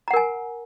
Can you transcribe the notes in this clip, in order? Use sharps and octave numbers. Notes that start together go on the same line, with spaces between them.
A#4 F#5 G#5 A#5